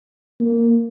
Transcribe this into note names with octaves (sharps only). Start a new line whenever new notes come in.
A#3